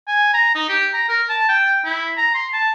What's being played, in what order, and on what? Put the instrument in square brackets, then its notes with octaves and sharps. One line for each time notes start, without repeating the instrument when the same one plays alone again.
[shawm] G#5
A#5
D#4
G4
A#5
A#4
A5
G5
E4
A#5
C6
A5